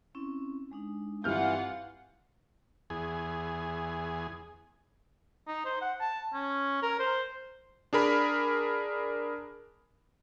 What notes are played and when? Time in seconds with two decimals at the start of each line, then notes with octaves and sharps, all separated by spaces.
0.15 C4 C#4 E4
0.71 G#3 D4 D#4
1.24 G2 E3 C4 F4 F#5 F6 G6
2.90 E2 G#4
5.47 D#4
5.65 C5
5.81 F#5
6.00 A5
6.33 C#4
6.82 A#4
6.99 C5
7.93 D4 G#4 A#4 B5